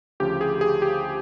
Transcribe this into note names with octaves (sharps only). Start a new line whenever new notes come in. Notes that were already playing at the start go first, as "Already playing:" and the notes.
D2 C#3 F3 G4
G#4
G#4
G4